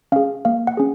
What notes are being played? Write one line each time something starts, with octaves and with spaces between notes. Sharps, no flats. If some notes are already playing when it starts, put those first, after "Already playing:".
C#4 G#4 F5
A#3 F5
F#5
C#4 G#4